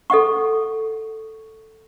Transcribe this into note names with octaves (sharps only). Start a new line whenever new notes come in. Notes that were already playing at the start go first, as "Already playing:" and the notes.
A4 D#5 F#5 C#6